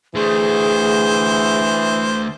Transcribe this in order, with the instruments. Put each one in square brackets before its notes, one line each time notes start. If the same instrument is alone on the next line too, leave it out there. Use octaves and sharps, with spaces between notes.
[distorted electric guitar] D3 A3 [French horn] E3 [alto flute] G#4 [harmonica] C5